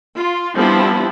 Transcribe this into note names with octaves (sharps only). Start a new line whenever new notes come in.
F4
F3 G3 B3 C4 D4 E4